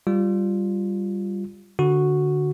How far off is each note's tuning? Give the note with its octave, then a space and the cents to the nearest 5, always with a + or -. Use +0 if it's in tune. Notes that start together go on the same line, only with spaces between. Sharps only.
G3 +0 F4 +0
D3 +0 F#4 -5